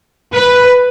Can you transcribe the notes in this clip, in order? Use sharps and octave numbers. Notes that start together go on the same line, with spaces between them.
B4